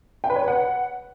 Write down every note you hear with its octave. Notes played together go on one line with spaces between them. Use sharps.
G5
B4
C#5
B4
F#5